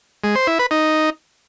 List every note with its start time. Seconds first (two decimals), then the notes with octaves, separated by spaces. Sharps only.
0.24 G#3
0.35 C5
0.47 E4
0.59 B4
0.71 D#4